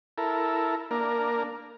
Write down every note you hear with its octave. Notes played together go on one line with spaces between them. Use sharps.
E4 A4 A#4
A#3 D4 A#4